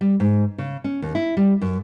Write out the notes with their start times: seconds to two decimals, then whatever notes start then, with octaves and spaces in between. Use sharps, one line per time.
0.01 G3
0.20 G#2
0.58 C#3
0.84 C#4
1.02 D#2
1.15 E4
1.37 G3
1.61 F#2